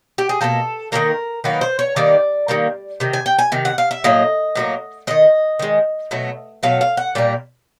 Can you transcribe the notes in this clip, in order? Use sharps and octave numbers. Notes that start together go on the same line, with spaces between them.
G4
G#4
B2 G3 A#3 A4
D#3 F#3 A#3 A#4
D#3 F#3 A#3 B4
C5
C#5
D#3 G3 A#3 D5
D#3 G3 A#3
C3 D#3
G#5
G5
G#5
C3 D#3
F#5
F5
E5
A2 F#3 A#3 D#5
A2 F#3 A#3
D#3 G#3 D#5
D#3 G#3
B2 F#3 A3
B2 F#3 A3 F5
F5
F#5
A#2 G3 A#3